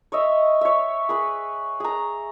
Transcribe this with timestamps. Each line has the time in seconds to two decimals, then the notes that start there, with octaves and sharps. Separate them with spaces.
0.12 C#5 D#5 E5
0.61 C#5 E5
1.09 G#4 B4
1.80 G#4 A#5